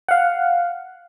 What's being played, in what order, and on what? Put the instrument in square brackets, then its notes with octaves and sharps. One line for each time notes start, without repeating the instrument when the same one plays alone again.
[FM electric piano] F5 F#5